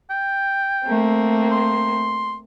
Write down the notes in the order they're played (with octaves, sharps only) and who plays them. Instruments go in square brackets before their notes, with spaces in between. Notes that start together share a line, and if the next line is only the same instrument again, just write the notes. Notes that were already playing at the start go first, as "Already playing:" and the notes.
[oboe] G5
[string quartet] A3 A#3 C4
[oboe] C6